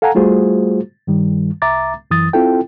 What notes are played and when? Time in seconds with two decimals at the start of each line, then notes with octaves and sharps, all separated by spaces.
0.02 A4 F5 F#5 G#5 A#5
0.15 G3 A3 F4 F#4 G#4 C5
1.07 G2 D#3 G3
1.62 C2 E5 A#5 D6 A6
2.11 F#2 E3 D#6 A6
2.33 C4 E4 F4 A4 G5